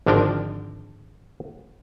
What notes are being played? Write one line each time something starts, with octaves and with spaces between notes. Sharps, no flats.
G#1 D3 F3 D4 A#4 G5